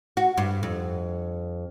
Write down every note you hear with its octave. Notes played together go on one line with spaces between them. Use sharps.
F#4
G2
F2